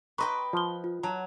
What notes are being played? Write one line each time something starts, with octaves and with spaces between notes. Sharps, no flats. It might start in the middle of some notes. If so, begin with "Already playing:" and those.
B4 D#5 G5 A#5 C6 C#6
F3 F4 G7
F4
F#3 A5 A#5